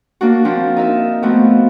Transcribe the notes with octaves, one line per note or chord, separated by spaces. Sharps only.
A#3 D4 F#4
F3 C4 D4
D#4 A#4 E5
F3 A3 B3 C4 F#4